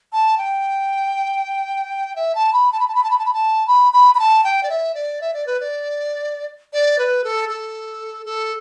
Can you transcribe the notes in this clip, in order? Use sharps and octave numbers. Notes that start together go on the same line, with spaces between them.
A5
G5
E5
A5
B5
A5
B5
A5
B5
A5
B5
A5
B5
A5
B5
B5
B5
A5
G5
D5
E5
D5
E5
D5
B4
D5
D5
B4
A4
A4
A4